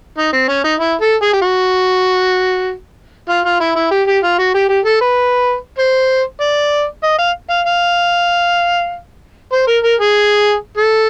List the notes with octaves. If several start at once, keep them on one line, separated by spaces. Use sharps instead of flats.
D#4
C4
C#4
D#4
E4
A4
G#4
G4
F#4
F4
F4
E4
E4
G4
G4
F4
F#4
G4
G4
A4
B4
C5
D5
D#5
F5
F5
F5
C5
A#4
A#4
G#4
A4